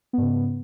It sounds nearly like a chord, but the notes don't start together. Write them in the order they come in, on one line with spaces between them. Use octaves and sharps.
B3 G#2 C#3